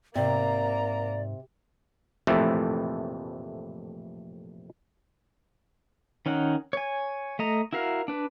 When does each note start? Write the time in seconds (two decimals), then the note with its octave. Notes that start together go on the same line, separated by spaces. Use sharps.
0.15 G#2 C3 A#3 D5 A#5
2.27 A#1 F2 A2 C3 E3 A3
6.26 D#3 C#4 D#4 F#5
6.73 C#5 G#5
7.39 A3 D#5 A#5
7.73 E4 F#4 A#4 F5
8.08 D4 B4